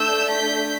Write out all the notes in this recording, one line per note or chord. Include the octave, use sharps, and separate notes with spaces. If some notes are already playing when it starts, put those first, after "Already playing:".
Already playing: A3 D4 A4 E6 G6
G6 B6